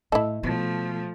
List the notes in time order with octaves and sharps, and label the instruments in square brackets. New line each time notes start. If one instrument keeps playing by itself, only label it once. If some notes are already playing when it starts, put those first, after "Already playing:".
[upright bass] A2 [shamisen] E4 A4 [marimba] D#5
[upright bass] B2 [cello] F3 A3